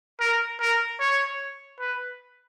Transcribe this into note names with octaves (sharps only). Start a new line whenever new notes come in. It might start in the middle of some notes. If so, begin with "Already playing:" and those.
A#4
A#4
C#5
B4